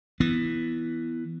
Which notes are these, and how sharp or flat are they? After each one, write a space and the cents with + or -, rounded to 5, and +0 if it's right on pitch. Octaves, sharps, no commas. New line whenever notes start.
E3 +0 B3 +0